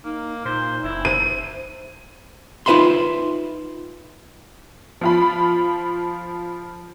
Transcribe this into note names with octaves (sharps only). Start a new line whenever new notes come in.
A#3 D#4
A#2 D#4 C5
F#1 E4
C5 D#7
D#4 F4 B4 E5 B5 C6
F3 F4 B5